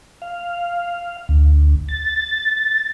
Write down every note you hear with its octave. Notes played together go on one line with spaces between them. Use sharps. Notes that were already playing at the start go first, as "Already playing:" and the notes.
F5
D2
A6